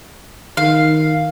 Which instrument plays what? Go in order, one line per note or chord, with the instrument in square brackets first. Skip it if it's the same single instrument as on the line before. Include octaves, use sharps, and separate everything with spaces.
[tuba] D#3 [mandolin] F5